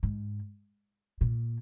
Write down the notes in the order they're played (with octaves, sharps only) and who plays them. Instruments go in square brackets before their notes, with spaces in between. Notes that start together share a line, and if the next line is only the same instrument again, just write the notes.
[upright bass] G#2
A#2